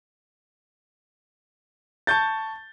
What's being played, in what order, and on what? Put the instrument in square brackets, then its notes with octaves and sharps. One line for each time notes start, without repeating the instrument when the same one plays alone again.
[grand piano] A5 C#6 G6 A6